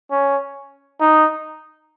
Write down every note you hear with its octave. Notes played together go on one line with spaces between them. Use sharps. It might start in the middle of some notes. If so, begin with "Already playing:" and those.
C#4
D#4